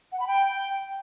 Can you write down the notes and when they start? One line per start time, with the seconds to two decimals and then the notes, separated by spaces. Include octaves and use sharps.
0.12 F#5
0.20 B5
0.27 G5